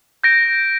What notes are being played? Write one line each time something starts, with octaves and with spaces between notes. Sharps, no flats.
G6 A#6 D7